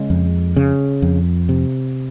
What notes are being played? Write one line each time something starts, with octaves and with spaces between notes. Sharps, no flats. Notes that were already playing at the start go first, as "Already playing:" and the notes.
Already playing: C#3 G#3
F2
C#3
F2
C3